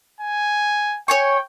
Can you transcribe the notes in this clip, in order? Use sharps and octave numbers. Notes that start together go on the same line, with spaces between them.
G#5
C#5 G5 G#5 C#6